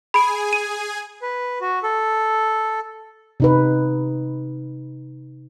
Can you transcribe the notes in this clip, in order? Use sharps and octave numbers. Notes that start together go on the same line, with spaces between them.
G#4 G#5 B5 D7
D#7
B4
F#4
A4
C3 D#4 B4